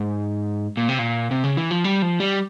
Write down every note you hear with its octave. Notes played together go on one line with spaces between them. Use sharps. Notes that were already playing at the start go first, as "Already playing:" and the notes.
Already playing: G#2
A#2
C3
A#2
C3
C#3
E3
F3
G3
F3
G3